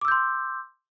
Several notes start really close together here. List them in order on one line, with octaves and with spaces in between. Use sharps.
D6 E6 G6 C6